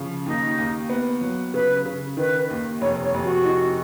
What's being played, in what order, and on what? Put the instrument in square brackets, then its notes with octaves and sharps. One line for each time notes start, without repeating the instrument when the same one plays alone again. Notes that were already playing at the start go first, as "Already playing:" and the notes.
Already playing: [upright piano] C#3 F3
[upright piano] D#2 [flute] D#4
[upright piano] D#2
B3
F#3
[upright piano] C#3 [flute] B4
[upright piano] C#3
[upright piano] D#3 [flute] B4
[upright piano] D#2
[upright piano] F1 [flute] C#5
[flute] C#5
[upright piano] F1
[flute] F#4
[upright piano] D#4